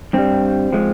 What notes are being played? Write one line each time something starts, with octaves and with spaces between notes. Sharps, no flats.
G2 G3 C4
F3 G#3